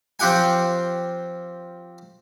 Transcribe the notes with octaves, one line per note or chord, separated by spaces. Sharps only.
F3 C4 F4 G4 F#5 G#5